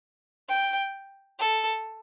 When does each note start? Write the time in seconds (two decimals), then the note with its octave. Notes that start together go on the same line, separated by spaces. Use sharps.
0.49 G5
1.39 A4